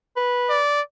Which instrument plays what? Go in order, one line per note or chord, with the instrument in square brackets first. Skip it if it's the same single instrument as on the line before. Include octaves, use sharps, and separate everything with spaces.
[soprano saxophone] B4
[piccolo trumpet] D5